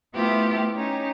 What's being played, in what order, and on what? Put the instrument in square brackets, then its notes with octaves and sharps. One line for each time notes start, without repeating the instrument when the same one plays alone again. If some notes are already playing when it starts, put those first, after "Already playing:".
[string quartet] A3 B3 E4 F4 G4 C5
C#4 D#4 G4 C#5